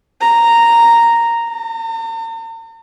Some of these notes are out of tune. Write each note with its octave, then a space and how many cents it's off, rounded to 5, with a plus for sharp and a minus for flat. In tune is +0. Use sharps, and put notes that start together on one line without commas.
A#5 -5
A#5 -45